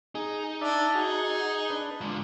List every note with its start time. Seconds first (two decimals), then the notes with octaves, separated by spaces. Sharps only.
0.15 D#4 G#4
0.61 D4 D5 E5
0.94 F#4 G#4
1.70 D4 B4
2.01 G#2 D3 F4